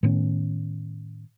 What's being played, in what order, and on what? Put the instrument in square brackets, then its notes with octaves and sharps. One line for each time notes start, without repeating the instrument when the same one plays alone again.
[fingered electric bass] A2 D#3 B3 C#4